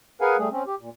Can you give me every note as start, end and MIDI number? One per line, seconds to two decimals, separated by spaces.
0.21 0.37 68
0.21 0.37 70
0.21 0.37 71
0.21 0.37 77
0.21 0.37 78
0.21 0.37 80
0.39 0.49 55
0.39 0.49 57
0.39 0.49 68
0.52 0.64 60
0.52 0.64 61
0.67 0.75 67
0.80 0.90 46